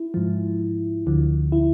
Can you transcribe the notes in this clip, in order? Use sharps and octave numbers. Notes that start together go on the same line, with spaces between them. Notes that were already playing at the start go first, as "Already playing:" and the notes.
Already playing: E4
G#2 F3
D2 D3 F3
E4